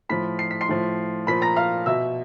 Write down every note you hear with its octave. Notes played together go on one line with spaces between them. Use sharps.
A2 F3 B5 B6
C7
B6
C6 C7
A2 F3
A#2 F3 B5 B6
A#5 A#6
F5 F6
B2 E5 E6